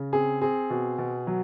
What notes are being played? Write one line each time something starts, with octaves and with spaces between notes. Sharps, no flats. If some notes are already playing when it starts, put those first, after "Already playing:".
Already playing: C#3
C4 G#4
C4 G#4
B2
B2
F#3